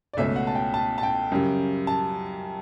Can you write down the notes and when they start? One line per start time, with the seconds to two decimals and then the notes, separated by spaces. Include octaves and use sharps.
0.13 D5
0.17 C#2 B2 A3 C#4 E5
0.36 F#5
0.47 A5
0.55 G5
0.74 A5
0.98 A5
1.03 G5
1.32 F#2 C#3 G3
1.87 A5